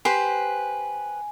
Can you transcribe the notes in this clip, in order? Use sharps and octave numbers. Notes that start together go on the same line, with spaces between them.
G4 B4 C5 G#5